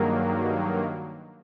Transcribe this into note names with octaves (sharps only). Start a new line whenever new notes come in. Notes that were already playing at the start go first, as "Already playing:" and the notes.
Already playing: G2 D#3 F#3 A#3 G#4 A#4